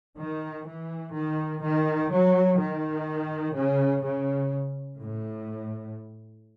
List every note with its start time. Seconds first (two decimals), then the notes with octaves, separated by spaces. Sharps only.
0.17 D#3
0.65 E3
1.14 D#3
1.62 D#3
2.10 F#3
2.58 D#3
3.55 C#3
4.03 C#3
4.99 A2